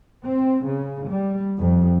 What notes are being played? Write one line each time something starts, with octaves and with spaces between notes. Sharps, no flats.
C4
C#3
G3
F2